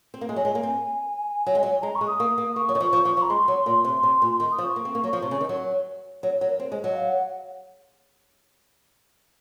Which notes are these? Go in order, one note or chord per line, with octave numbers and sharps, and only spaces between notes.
C4
A#3
G#3
F#3 G#5
G#3
A#3
C4
F#3
G#3
F#3
G#3 A#5
C#6
G#3
D#6
A#3
A#3
A#3 C#6
F#3
D#3
F3
F3
F3
F3
A#5
G#3 C6
F#3
A#2
C3
C3
A#2
D#3
D#6
F3
C#6
A#3
C4
A#3
F#3
F3
C3
C#3
D#3
F#3
F#3 C#5
F#3
A#4
C4 C5
G#3 C#5
F#3 D#5
F5
F#5